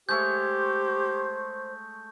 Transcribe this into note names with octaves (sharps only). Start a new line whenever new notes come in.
G#3 A3 G4 C5 C#5 G6